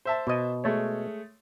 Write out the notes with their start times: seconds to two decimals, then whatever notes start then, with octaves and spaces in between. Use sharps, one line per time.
0.05 C5 E5 A5
0.27 B2 D#5
0.64 G#3 A3 C#5